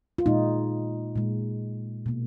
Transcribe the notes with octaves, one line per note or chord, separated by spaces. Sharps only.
F4
A#2 G#3 D#4
A#2 G#3
B2 A#3